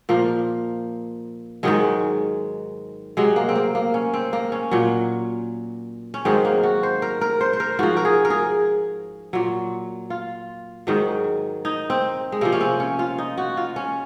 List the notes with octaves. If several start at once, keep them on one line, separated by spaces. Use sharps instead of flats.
A#2 F3 A#3
G#2 D#3 F#3 G#3
C3 F#3 G#3
A#3
C4
A#3
A#3
C#4
C4
A#3
C#4
A#2 F#3
C#4
G#2 D#3 F#3 C4
A#3
F#4
C5
A#4
A#4
C5
C5
A#4
G#2 F3 F#4
A#4
G#4
A#4
G#4
A#2 F#3
F4
G#2 D#3 F#3
D#4
C4
G#3
C3 F3 A#3
C#4
C4
C#4
F4
D#4
F#4
F4
C#4